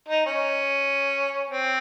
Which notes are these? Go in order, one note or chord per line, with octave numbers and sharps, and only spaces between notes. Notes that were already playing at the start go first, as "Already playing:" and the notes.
D#4
C#4
C4